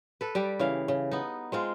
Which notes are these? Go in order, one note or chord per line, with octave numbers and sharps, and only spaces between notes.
A4 B4
G3 G4
C#3 E3 F5
C#3
B3 D#4
G#3 C4 F4